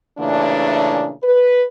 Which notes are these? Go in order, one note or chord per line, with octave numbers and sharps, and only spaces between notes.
A#2 C#3 E3 A3 D4
B4